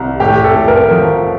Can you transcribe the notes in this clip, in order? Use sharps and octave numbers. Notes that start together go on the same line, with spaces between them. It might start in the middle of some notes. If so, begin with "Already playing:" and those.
Already playing: C2
A2 G4
A4
A2
A#4
F3